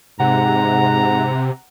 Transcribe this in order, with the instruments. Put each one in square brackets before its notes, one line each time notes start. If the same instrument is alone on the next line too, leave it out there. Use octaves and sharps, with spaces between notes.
[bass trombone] G#2 [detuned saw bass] C3 [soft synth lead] F#5 [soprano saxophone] A#5